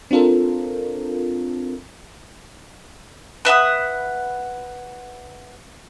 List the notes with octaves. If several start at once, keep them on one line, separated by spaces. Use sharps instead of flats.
C4 D4 F4 A4 A#4
B4 E5 F#5 D#6